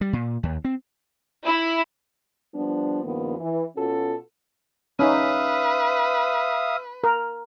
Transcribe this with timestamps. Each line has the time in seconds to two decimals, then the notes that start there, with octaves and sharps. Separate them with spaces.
0.01 G3
0.13 A#2
0.43 D#2
0.65 C4
1.46 E4
2.54 F3 G3 B3 D4
3.04 G2 D#3 F3 A#3 B3
3.39 E3
3.76 B2 C#4 F4 F#4 A4
4.99 C#4 D#4 B4 E5 F5 D#6
7.04 A#4